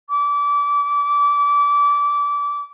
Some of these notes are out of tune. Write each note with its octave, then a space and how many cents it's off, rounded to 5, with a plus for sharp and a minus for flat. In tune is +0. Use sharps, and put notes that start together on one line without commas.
D6 -25